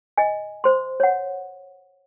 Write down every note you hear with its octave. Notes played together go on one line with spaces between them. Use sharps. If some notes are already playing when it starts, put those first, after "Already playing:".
D#5 G#5
C5 C6
C#5 F#5